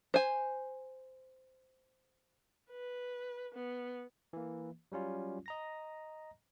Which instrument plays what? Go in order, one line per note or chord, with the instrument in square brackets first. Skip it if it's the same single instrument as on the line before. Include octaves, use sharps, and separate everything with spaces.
[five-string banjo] C5 G#5
[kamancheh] B4
B3
[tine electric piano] E3 A#3
F#3 G3 C#4 F4
D#5 A#5 A#6